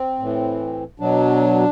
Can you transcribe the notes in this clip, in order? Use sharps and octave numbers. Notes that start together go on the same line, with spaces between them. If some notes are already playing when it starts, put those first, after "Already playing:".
Already playing: C4
A2 E3
B2 F#3 D4